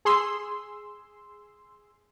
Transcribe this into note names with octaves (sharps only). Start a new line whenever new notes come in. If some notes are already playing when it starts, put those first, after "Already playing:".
G#4 C6 E6